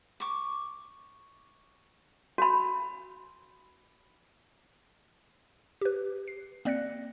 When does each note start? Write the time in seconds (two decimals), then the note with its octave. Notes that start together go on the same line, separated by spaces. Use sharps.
0.20 C#6 D6
2.38 F#4 B5
5.81 G4 B4
6.28 C7
6.65 A#3 C4 D5 F#6 A#6 C#7